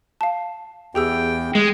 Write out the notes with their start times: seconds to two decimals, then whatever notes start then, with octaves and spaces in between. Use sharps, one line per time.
0.21 F5 A5
0.95 E2 G4 G#4 G5 E6
1.55 G#3